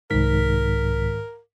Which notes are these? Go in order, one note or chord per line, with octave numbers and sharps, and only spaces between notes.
C2 G#2 D#3 A#4 B6